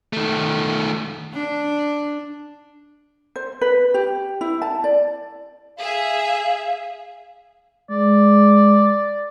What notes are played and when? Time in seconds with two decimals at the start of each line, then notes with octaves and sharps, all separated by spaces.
0.13 D#3 A3
1.33 D4
3.36 C5
3.61 B4
3.94 G4
4.41 E4
4.62 A5
4.84 D5
5.78 G#4 E5 F5
7.90 G#3 D5